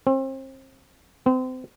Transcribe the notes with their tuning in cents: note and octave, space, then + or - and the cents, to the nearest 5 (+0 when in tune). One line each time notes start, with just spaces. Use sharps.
C4 +35
C4 -30